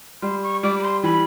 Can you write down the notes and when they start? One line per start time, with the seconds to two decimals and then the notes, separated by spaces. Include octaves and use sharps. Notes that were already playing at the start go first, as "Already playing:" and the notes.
0.22 G3 C6
0.43 C#6
0.63 G3 D6
0.79 B5
0.83 C6
1.03 E3 B5